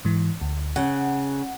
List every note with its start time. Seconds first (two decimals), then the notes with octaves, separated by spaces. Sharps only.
0.05 G#2 E3
0.41 D2
0.76 C#3 F#5